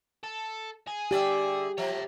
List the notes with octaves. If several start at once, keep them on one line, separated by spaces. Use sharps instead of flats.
A4
G#4
D3 G4 D5 E5
F3 C#5 E5